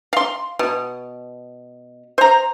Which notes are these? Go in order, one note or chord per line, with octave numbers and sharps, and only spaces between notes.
F5 C6
B2
C5 A#5